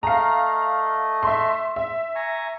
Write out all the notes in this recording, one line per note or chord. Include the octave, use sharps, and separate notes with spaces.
A3 D#5 F5 A#5
E5 C6
E5
G#5 A#5 C#6